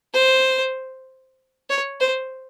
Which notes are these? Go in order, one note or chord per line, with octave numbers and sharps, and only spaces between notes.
C5
C#5
C5